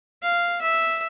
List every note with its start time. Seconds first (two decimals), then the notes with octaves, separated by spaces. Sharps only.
0.23 F5
0.61 E5